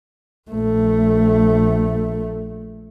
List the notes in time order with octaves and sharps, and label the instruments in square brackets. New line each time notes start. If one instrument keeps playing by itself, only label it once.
[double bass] A#1 A3